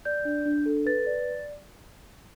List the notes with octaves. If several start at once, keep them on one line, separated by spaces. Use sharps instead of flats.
D5 G6
D4
D4
A4
B4 A6
D5